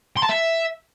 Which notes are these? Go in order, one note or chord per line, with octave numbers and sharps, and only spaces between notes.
C6
A5
E5